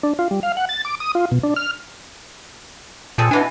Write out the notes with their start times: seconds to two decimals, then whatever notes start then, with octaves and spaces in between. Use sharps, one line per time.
0.03 D4
0.19 F4
0.31 G3
0.43 F5
0.57 F#5
0.69 A6
0.85 D6
1.00 D#6
1.15 F4
1.32 B2
1.43 D4
1.56 F6
3.18 A#2 C4 G#4 A4
3.31 B2 E3 D4 G#5